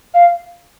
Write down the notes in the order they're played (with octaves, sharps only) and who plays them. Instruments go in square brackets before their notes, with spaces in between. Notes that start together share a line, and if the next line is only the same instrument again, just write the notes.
[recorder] F5